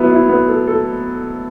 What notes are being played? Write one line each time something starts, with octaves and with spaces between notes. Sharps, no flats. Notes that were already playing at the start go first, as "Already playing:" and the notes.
Already playing: F#3 B3 E4
E4
B3
A4
A4